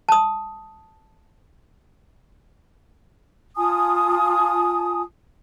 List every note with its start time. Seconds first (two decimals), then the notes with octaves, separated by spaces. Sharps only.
0.09 A5 D#6
3.57 F4 G#5 A5 D#6